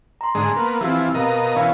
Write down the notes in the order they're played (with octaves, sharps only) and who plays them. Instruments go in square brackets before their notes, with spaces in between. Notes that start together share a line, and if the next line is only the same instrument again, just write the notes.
[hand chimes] A#5 C6
[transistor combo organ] G#2 D3 G#3
A#3 B3
[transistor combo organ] E3 F3 [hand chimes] C4 G4 E6
[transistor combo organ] B2 D#5 A#5 [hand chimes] A#4 F5
[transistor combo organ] B2 E3 C#4 [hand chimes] F5 E6 C#7